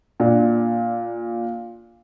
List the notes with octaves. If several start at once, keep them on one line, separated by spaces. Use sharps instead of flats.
A#2 D4